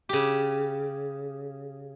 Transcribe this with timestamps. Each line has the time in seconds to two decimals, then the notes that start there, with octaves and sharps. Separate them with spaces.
0.09 C#3 G4